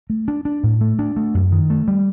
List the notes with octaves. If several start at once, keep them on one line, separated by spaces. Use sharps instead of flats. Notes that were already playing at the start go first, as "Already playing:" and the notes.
A3
D4
D4
A2
A3
D4
A3
F#2
D#3
A3
G3